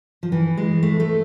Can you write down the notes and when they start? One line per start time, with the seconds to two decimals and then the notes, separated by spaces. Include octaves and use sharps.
0.23 F3
0.32 E3
0.57 G#3
0.83 A3
1.00 A3